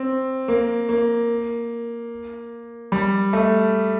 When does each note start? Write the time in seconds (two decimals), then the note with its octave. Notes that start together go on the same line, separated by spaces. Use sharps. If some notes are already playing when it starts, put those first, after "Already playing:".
Already playing: C4
0.48 A#3
0.89 A#3
2.92 G3
3.33 A3